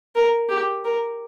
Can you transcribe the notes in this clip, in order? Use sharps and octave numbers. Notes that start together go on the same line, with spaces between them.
A#4
G4
A#4